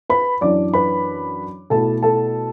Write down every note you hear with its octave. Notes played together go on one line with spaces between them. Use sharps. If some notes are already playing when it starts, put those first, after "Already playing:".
B4 B5
F#2 E3 D4 D5 D6
B4 B5
B2 A3 E4 A4 A5
A4 A5